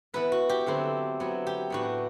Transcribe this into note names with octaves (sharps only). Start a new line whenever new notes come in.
E3 B3 E4 B4
F#4
G4
D3 F#3 A3 C4 E4
F#3 B3 E4
G4
A2 E3 B3 D4 F#4